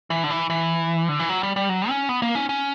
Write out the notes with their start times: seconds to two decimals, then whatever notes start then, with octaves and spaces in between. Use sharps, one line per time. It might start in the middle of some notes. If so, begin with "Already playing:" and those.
0.10 E3
0.24 D3
0.30 E3
0.50 E3
1.09 D3
1.19 E3
1.30 F#3
1.43 G3
1.56 G3
1.69 F#3
1.89 C#4
2.09 B3
2.22 A#3
2.35 C#4
2.49 C#4